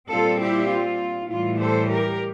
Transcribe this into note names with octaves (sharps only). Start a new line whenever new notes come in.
A#2 G3 C4 F4 A4
E4 G4
F4
A2 E3 G3 F4
A4 C5
G4 A#4